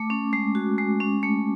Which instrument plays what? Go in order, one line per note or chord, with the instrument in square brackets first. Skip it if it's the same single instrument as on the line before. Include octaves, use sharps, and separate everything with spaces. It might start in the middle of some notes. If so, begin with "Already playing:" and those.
Already playing: [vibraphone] A3 D6
C#4
G#3
F#4
G#3
C#4
A3